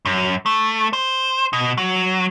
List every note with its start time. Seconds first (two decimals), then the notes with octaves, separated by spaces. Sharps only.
0.06 F#2
0.46 A3
0.93 C5
1.53 B2
1.78 F#3